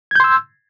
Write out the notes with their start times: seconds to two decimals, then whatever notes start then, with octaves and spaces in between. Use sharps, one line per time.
0.11 G#6
0.15 G6
0.20 C6
0.24 E6